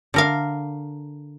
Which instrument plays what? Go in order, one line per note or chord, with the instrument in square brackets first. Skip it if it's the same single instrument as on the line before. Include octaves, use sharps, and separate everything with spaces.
[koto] D3 A#4 F5